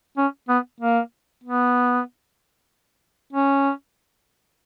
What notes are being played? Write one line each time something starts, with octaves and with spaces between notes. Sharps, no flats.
C#4
B3
A#3
B3
C#4